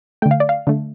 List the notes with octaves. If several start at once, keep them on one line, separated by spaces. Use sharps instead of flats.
D3 A3 G5
F5
D5
F5
D3 A3